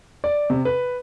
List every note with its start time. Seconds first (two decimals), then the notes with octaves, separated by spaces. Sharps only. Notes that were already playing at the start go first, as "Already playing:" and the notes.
0.24 D5
0.50 C3
0.65 B4